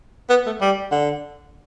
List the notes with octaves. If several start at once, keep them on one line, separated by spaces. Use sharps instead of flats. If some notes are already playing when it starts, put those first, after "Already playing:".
B3
A3
G3
D3